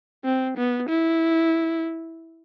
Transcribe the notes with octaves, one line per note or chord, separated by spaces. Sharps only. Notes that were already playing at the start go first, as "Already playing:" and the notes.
C4
B3
E4